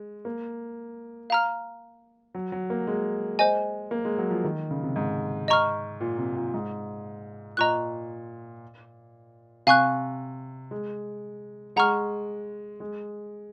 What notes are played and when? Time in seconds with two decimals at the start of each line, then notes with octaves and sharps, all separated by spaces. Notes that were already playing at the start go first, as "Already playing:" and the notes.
Already playing: G#3
0.25 A#3
1.30 F5 A#5 F6
2.35 F#3
2.52 F#3
2.70 A#3
2.87 G#3
3.39 C5 D#5 G#5
3.91 A#3
4.05 G#3
4.18 F#3
4.30 F3
4.44 D#3
4.71 C#3
4.83 C3
4.96 G#2
5.48 D#5 A#5 C#6 F6
6.00 A#2
6.18 C3
6.36 A#2
6.54 G#2
7.57 A#2 D#5 A#5 C#6 F#6
9.67 C3 F5 G#5 C#6 F#6
10.71 G#3
11.76 G#3 F#5 A#5 C#6 F6
12.80 G#3